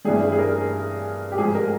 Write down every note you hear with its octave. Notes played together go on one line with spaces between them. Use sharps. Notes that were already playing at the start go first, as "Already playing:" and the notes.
G2 E3 G3 G#4
G#4
A#4
G4
G#2 F3 G#4
A#4